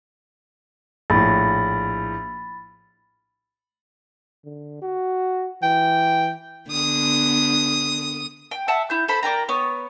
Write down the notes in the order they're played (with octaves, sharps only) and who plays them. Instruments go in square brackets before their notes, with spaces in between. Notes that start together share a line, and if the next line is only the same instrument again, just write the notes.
[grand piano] A#1 A2 [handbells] B5 A6
[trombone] D3
F#4
[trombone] E3 [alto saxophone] G5
[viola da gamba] D3 B3 [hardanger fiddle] D#6
[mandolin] G5
E5 F#5 A5
E4 G6
A4 C5 B5
A#3 D5 G5 A#5
B3 C#5